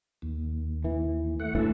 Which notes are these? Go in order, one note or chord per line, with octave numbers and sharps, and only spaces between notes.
D#2
E3
A3 F#5
D2 A2 E3 A4